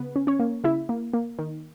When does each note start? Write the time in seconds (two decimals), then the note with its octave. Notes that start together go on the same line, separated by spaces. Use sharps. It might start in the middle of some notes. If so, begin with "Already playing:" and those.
Already playing: C#3 B3 B4
0.16 C#4
0.27 C#4 C#5
0.40 A#3
0.64 C#3 E4 E5
0.89 A#3
1.13 A#3
1.39 D#3